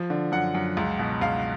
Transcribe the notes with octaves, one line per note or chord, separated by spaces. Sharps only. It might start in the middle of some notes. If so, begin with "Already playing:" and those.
Already playing: F3
D3
F#2 F#5
F#2
C#2
B2
C#2 F5